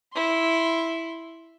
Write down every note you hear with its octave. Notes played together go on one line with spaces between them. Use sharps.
E4 C6